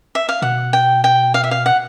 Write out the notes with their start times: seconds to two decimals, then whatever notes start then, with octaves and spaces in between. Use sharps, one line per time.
0.15 E5
0.29 F5
0.42 B2 F#5
0.73 G5
1.04 G5
1.34 F5
1.44 E5
1.51 F5
1.66 F#5